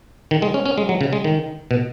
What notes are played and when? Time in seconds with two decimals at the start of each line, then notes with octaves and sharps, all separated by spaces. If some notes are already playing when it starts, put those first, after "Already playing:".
0.31 D#3
0.42 G#3
0.54 C#4
0.66 C#4
0.78 G#3
0.89 F#3
1.01 C#3
1.13 G#3
1.24 D#3
1.71 B2